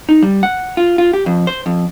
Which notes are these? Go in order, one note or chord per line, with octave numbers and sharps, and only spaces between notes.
D#4
G3
F#5
F4
F4
G4
F2
C5
F2